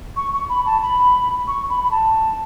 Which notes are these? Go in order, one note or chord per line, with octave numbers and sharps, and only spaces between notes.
C#6
C#6
B5
A5
B5
C#6
B5
B5
A5